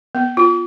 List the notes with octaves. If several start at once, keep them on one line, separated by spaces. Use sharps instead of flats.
B3
F4